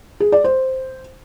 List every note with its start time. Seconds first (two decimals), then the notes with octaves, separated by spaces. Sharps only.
0.20 G#4
0.32 D5
0.44 C5